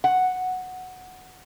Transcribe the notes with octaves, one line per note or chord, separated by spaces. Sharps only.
F#5